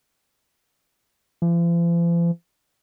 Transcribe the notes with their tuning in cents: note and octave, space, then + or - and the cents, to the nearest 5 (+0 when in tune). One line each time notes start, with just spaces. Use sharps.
F3 -45